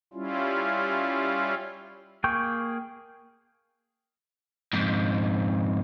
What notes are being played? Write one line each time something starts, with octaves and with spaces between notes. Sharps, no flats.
G3 C#4 E4 F4
A#3 G#4 G5 C#6 G6
F2 G#2